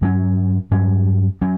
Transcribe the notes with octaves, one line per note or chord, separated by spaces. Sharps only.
G2 F#3 C#4
G2 F#3 C#4
F#3 C#4